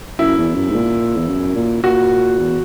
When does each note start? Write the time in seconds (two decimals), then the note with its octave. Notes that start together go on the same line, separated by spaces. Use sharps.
0.19 F#2 E4
0.38 E2
0.56 F#2
0.70 G#2
0.74 A#2
1.17 E2
1.29 F#2
1.56 A#2
1.83 A#2 F#4
2.39 E2